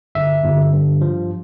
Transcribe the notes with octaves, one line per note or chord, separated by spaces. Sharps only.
G1 E5
G1
G2
F3